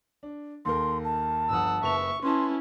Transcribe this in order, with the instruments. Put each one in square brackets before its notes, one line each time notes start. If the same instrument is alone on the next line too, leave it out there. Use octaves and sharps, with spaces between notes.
[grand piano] D4
[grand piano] D#2 A4 A#4 [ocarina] C6
[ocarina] A5
[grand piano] G1 F3 D#6 [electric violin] F#5 E6
[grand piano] F#1 B4 F7 [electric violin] E5 C#6
[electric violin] C#4 E4 [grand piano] B4 G#5 A5 [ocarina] C6